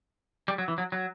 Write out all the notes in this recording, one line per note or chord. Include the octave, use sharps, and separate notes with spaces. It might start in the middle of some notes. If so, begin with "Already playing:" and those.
G3
F#3
E3
F#3
F#3